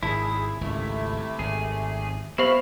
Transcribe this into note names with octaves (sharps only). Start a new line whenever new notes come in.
G#1 C3 E4 G#4 A5
G#1 C#2 C3 A3
G#1 G#4
B3 E4 G4 C5 E5 F5 B5